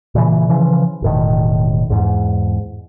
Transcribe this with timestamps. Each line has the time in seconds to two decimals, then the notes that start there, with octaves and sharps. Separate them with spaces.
0.15 A#2 C#3 E3
0.49 C#3 E3 F3
1.02 E1 A2 D#3
1.90 E2 G#2